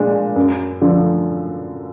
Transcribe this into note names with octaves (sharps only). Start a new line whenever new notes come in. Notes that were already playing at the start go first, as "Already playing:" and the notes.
Already playing: A#2 G#3 D4
F#2
D3 F3